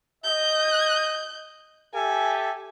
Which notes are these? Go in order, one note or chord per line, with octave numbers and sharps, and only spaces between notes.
D#5 G6
G4 A4 E5 G#5